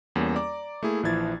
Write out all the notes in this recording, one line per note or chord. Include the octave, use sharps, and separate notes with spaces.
E2 G3 A#3 C#4
D5 A#5 D6
A3 A#3 E4 G#4
A#1 E3 F3 E4 G#6 A6